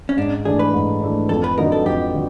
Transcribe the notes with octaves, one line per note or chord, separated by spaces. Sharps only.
C#4
G#2 D4
E3 A3 D4 G#4
B4
G#2
E3 A3 D4
F2 A4
B4
D3 F#3 B3 D#4 A#4
A4
F2 G4
D3 F#3